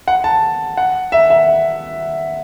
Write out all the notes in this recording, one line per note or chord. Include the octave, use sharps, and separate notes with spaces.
F#5
A5
F#5
E5
E5